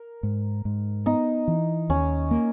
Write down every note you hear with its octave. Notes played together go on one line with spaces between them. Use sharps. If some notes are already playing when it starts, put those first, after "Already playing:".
Already playing: A#4
G#2
G#2
B3 D#4
E3
D#2 C#4
A#3